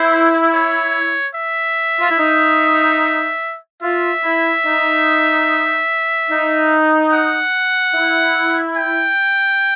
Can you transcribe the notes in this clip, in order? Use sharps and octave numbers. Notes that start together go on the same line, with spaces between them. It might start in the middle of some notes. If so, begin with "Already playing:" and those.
Already playing: E4 C5
C#5
E5
F4
E4
D#4
F4 E5
E4
D#4
D#4
F#5
E4
G5